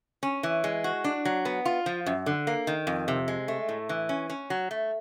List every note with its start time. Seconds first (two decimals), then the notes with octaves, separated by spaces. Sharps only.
0.23 C#4
0.43 E3
0.64 G#3
0.84 F#4
1.04 D4
1.25 F#3
1.45 B3
1.65 F4
1.86 F3
2.06 F#2
2.26 D3
2.47 A#3
2.67 D#3
2.87 F2
3.08 C3
3.28 G#3
3.48 A3
3.69 A2
3.89 E3
4.09 C#4
4.30 C#4
4.50 F#3
4.71 A3